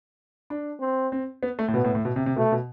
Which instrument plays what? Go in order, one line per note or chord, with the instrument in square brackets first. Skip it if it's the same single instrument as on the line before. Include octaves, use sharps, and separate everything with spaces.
[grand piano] D4
[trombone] C4
[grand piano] C4
B3
A3
A2
[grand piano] B2 [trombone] B3
[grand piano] A2
A2
B2
C3
C3
[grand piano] B2 [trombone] A3
[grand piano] B2